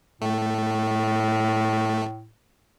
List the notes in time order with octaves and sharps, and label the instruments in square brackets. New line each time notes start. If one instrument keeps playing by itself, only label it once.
[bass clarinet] A2 [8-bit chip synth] A3